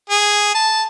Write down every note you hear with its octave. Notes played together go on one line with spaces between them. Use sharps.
G#4
A5